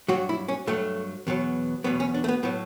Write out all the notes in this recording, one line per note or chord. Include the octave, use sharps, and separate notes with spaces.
G2 F#3 F#4
E4
C#4
G2 F#3 A3
E2 B2 F#3
E2 B2 F#3 B3
C#4
D4
A3
B3
A2 F#3 B3